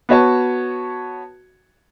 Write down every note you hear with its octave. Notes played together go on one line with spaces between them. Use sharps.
B3 F#4 C#5 A5